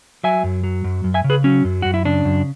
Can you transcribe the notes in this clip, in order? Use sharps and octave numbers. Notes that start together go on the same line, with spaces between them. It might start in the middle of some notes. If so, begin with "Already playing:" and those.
F#3 E5 G#5
F#2
F#3
F#2
F#2
E5 G#5
C#3
G#4 B4
F#3 C#4
F#2
F#2 F#4
E4
C#3 D4
F#2